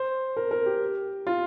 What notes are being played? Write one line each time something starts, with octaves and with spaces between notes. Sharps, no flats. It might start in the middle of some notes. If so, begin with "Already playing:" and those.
Already playing: C5
A#4
A#4
G4
F4